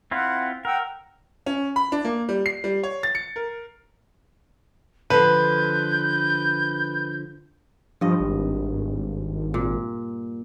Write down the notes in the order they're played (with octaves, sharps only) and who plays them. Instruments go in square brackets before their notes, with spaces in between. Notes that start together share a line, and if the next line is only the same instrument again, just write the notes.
[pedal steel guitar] C4 E4 F4 [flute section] F#5
[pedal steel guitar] A#4 [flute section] F#5 G5 E6
[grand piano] C#4
B5
D4
A#3
G3
C7
G3
C#5
A6
C#7
A#4
[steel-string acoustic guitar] D3 F3 [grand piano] B4 [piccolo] G6
[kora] G2 D#5 [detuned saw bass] F3
[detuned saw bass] G#1
[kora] A#2